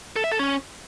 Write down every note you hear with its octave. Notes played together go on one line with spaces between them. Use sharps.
A4
E5
A4
C#4